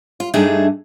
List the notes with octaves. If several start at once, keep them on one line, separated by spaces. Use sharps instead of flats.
F4
G2 A3 D4 D#4 G#4 E5